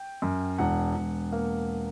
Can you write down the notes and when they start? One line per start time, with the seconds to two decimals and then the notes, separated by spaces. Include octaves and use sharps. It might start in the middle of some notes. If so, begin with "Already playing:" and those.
Already playing: G5
0.22 F#2
0.58 E1 F#5
0.95 E1
1.32 A#3